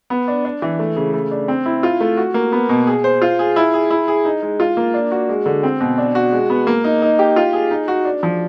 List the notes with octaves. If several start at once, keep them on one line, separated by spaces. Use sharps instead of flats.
B3
D4
D4
E3
A3
C#3
A3
D4
C4
E4
F4
A3
F#4
A#3
B3
B2
G#4
C5
F4
G#4
E4
G#4
E4
G#4
D#4
G#3
F4
A#3
D4
F#4
G#3
D3
C4
B2
D4
F#4
G#3
B3
A#3
D#4
D#4
G4
F4
G#4
D#4
F#4
D4
F3